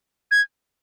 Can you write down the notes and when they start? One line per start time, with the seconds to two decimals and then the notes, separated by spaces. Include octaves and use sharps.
0.31 G#6